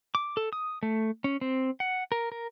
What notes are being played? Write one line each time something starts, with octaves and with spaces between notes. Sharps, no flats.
D6
A4
D#6
A3
C#4
C4
F#5
A#4
A#4